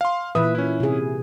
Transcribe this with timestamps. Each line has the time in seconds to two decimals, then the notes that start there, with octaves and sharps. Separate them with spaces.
0.01 F5 C6
0.35 A#2 E3 B4 E5 D#6
0.55 C#4 E4
0.80 C3 G#4